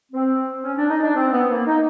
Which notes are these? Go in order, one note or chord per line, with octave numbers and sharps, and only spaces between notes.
C4
C#4
D4
D#4
D4
C4
B3
A#3
D#4